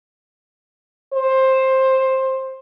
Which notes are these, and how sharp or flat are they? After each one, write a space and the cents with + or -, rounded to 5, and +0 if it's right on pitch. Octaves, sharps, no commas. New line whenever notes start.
C5 +15